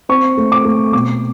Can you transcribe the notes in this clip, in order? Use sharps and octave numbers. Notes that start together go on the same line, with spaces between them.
C4 C#6
A3
D6
A3
B2 D6